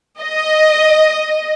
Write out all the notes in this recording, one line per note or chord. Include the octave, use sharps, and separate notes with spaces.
D#5